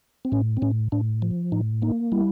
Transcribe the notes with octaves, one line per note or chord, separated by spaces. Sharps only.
C4
A2 C#4
C4
A2 C#4
A2 D4
F3
A2 D#4
A#3 D#4
G3 E4